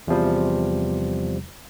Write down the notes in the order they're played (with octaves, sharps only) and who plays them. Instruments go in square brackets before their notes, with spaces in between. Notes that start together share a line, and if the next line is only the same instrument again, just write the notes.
[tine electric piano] E2 C3 F3 G3